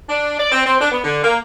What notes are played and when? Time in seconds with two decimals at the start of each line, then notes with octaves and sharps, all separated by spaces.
0.09 D4
0.39 D5
0.52 C4
0.66 C4
0.80 D4
0.92 B3
1.04 D3
1.23 A#3